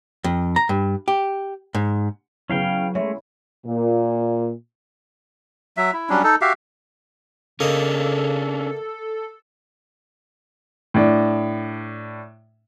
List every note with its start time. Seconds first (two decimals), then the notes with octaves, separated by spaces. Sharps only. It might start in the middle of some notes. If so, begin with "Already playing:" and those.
0.24 F2
0.56 A#5
0.69 G2
1.08 G4
1.74 G#2
2.50 C#3 F#3 B3 C#4 E4 F5 G5
2.95 G#3 A3 C#5 E5
3.66 A#2
5.77 F#3 E5
5.93 E4
6.09 F#3 G3 C#4 D4
6.24 D#4 A4
6.41 F#4 G4 E5 F5
7.60 C#3 A#3 C#4 D4 A4 D#5
10.94 A2 D4